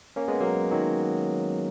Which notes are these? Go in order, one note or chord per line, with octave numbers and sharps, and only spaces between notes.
A#3 C#4
G#3 B3
F#3 A#3
D#3 F#3